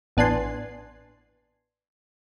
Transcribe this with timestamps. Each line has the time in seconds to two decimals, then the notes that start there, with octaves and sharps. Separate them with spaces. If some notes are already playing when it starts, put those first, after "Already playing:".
0.17 A1 B3 D4 G#5 C6